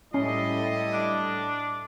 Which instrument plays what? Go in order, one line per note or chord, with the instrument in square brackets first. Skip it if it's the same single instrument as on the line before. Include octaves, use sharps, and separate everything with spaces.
[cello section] A2 G3 A4 [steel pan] C#4 [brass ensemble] E4 D#5 [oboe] C6
[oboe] D4